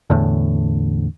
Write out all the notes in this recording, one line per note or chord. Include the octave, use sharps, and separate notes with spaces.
E2 A2 D3